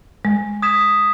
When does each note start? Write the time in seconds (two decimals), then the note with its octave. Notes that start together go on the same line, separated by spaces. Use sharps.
0.25 G#3
0.62 D#6 G#6 B6 E7